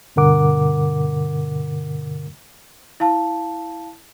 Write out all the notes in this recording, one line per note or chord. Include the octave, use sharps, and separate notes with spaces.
G2 B2 D3 A#4 F#5 D6
E4 F5 A5